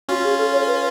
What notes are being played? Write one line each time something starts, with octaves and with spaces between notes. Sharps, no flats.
C#4 F4 F#4
G#4
A4
C#5
B4